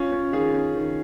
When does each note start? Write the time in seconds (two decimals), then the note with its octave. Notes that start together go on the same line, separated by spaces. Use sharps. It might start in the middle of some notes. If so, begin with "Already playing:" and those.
Already playing: C#4 F4
0.12 C#4
0.33 D#3 F4 G#4
0.54 C#4
0.75 D#3